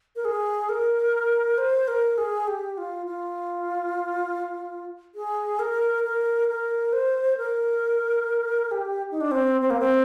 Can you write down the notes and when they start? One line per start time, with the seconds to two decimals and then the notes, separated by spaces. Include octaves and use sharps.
0.16 A#4
0.25 G#4
0.69 A#4
1.58 C5
1.88 A#4
2.18 G#4
2.48 G4
2.78 F4
3.07 F4
5.15 G#4
5.59 A#4
6.04 A#4
6.48 A#4
6.93 C5
7.37 A#4
8.71 G4
9.11 D#4
9.21 D4
9.31 C4
9.61 C4
9.70 A#3
9.80 C4